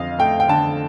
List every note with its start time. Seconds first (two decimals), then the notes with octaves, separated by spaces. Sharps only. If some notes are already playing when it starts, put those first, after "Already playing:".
Already playing: F2 D3 C4 D#5 F5
0.19 A3 G5
0.40 G5
0.48 D3 A5